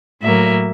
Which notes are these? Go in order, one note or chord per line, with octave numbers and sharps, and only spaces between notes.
A2 F#3 A#3 E5